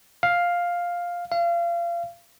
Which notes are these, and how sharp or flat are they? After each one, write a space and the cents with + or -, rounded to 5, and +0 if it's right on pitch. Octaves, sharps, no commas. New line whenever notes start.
F5 +5
F5 -30